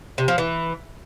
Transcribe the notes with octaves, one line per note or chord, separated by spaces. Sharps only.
C3
F3
E3